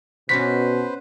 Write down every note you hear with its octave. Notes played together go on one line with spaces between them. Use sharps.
B2 C#4 D4 F#4 B4 C5 B6